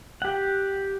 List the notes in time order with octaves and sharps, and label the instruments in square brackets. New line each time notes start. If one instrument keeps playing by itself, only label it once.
[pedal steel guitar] G4 F#5